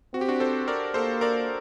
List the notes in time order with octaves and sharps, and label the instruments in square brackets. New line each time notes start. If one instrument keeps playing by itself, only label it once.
[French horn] C4 [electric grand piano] F#4
[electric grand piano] G4
D4 F#4
A4 C5
A#4 D5
[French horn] A#3 [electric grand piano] A4 C5
[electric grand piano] A#4 D5